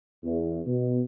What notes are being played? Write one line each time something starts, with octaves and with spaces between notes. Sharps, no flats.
E2
B2